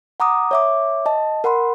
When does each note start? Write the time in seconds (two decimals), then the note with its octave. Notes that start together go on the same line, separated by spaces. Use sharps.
0.20 F#5 A#5 D6 D#6
0.51 C#5 E5 D6
1.06 D#5 A5
1.44 A#4 F#5 B5 C6